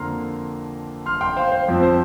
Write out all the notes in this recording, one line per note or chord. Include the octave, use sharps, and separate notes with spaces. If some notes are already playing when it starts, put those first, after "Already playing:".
Already playing: F2 D3 A#3 A#5 C6 F6
C6 F6
G5 C6
C5 F5
C5
F2 F3 C4
C5